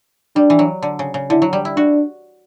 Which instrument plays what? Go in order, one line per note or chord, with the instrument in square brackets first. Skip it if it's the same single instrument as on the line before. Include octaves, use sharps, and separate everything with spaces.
[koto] G3 [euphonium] D4
[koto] E3
F#3
D3
C#3
C#3
[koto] D3 [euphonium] E4
[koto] F#3
G3
E4
[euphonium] D4 [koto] F#4